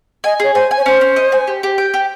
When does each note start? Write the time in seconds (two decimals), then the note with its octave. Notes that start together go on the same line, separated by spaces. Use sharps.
0.24 D#5 G#5
0.40 G#4 C#5
0.54 C5 G#5
0.71 G#5
0.78 C#5
0.85 C#4 C5
1.01 C#4
1.16 D#5
1.32 G#5
1.47 G4
1.63 G4
1.78 G5
1.94 G4